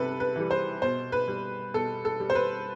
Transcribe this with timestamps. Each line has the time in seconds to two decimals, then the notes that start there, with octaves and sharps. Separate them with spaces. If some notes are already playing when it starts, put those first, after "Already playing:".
Already playing: C3 G3 A4 B4
0.20 B4
0.36 E3 G3
0.51 C5
0.82 B2 C5
1.12 B4
1.28 G3
1.74 B2 A4
2.05 A4
2.20 G3
2.30 C5
2.35 B4